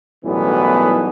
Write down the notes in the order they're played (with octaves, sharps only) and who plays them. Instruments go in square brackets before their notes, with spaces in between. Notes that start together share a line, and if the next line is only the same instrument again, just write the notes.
[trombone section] B1 F#2 A2 E3 G3 B3